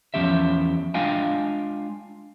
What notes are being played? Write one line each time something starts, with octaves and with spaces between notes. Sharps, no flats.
E2 C3 F3 C#4 G4 E5
G#3 D4 F4 F5 G5 G#5